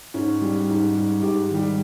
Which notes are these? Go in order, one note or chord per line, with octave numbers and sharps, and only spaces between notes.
G#2 C#4
G3
G#2
G3
G#2 G4
D#3 G3